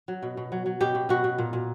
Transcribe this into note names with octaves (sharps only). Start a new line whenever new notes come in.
F#3
B2
B2
F#3
F#3
B2 G4
B2
B2 F#4
B2
A#2
A#2